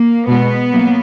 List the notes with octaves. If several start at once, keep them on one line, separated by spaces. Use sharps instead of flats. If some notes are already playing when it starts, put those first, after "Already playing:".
Already playing: A#3
B2 G#3 B3
F#3 A#3